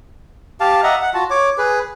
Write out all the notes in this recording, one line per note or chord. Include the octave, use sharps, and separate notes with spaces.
G4 F5 A5
D#5 E5 F#5 A#5
F#5
F4 F#4 A5
C#5 D6
G#4 B4